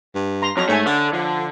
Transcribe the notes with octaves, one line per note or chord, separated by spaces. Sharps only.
G2
A#5 C6
F2 F#3 C#5 A#5
G#2 A3 C#5 E5 G#5
D3 A4 D5
D3 F3